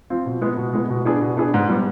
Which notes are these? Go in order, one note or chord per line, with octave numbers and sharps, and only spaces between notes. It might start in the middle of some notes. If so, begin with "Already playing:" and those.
F3 C4 F4
B2
G#3 B3
B2
G#3 B3
B2
B3 D4 G#4
B2
B3 D4 G#4
G#2
G3 B3